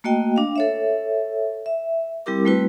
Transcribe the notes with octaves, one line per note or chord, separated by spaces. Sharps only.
A3 A#3 F#4 D#5 G5
D4 F5
A4 C#5 E5
E5
G3 C4 E4 G4 A#4 D6
G3 A3 C4 E4 F#4 B4